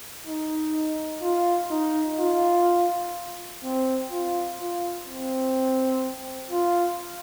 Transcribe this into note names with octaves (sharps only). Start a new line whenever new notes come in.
D#4
F4
D#4
F4
C4
F4
F4
C4
F4